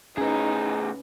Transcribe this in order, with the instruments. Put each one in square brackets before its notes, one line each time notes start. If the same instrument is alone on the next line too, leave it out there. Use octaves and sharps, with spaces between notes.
[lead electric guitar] A2 G#4 [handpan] C#4 B4 [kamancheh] D#4